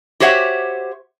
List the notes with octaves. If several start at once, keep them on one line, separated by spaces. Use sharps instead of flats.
F#4 G4 C5 C#5 E5 F#5